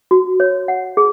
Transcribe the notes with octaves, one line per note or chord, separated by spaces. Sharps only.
F#4
C#5
F#5
G#4